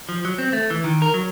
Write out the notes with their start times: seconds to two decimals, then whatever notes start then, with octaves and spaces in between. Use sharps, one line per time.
0.09 F3
0.25 F#3
0.38 C4
0.53 A3
0.70 E3
0.84 D#3
1.02 A#4
1.14 F#3